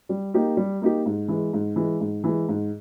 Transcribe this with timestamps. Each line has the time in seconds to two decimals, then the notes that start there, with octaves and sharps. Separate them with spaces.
0.09 G3
0.34 A#3 D#4 G4
0.57 G3
0.82 A#3 D#4 G4
1.06 G#2
1.28 E3 G#3
1.53 G#2
1.76 E3 G#3
2.00 G#2
2.24 E3 G#3
2.49 G#2